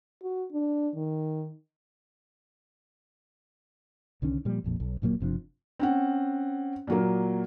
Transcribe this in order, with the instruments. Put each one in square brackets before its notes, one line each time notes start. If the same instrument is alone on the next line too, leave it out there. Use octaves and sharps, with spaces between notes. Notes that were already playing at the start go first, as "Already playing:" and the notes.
[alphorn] F#4
D4
D#3
[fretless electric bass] C2 D3 D#3 C#4
A#2 F3 G3
A#1 F2 A#2
B1
D1 A#2 F#3 A#3
F#1 C3 F3 D4
[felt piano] C4 C#4 F#5
A#2 F#3 A#3